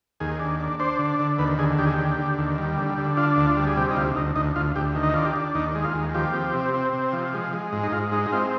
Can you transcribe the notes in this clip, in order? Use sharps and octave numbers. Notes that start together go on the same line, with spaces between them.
D#2 G#4
D4
D4
D4 C5
D3
D3
D#2 B4
D3 G#4
D#2 G4
G#4
D3 G4
D3
D#2
G3
D3
D3
D4 F4
D2
F4
G3
G#4
C3 G4
D#4
D2 F4
D2 D#4
D2 D#4
D2 F4
D2 G4
D#3
D#4
D4 F4
G4
D4
D#2 D#4
G#3
F4
D#2
F3 G4
C4
C3
C4
C3
F3
G#3
G#3
G#2
D#4
G#2 F4
G#3 D#4
D#4
C4 F4